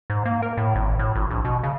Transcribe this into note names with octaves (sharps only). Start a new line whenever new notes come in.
G#2
A#3
A#4
A2
G#1
A2
G#1
A#1
B2
C#3